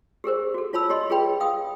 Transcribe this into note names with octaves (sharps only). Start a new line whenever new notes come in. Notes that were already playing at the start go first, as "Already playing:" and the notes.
G4 G#4 A#4 C5
F#4 A4
F4 C#5 A5 B5 E6
G4 C#5 D#5 C6
F4 G#4 B4 C#5 G5 B5
F5 G5 D#6